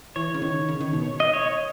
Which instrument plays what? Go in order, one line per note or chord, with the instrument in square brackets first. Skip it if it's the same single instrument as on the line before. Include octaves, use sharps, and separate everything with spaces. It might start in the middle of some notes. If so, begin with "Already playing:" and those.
[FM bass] E3 [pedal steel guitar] C#5
[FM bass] C#3
D#3
C#3
D#3
B2
[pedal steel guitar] D#5
C#5